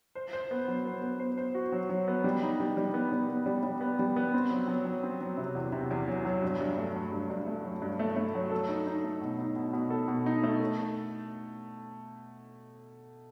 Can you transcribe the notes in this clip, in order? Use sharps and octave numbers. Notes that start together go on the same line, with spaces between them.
C5
C5
B3
F#3
B3
B3
C5
C5
F#4
F#3
F#3
B3
G3
D#4
G3
G3
B3
G3
B3
G3
G3
B3
G3
B3
C4
F#3
F#3
F#3
C4
F#3
C3
E2
C3
E2
F#3
F#3
G2
G2
A3
F#3
G2
G2
A3
F#3
G2
A3
A3
F#3
A4
D#4
D#4
A3
B2
D#4
B2
B2
A4
B2
D#4
A3
A4
A4